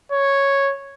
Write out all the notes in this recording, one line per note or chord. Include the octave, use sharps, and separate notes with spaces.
C#5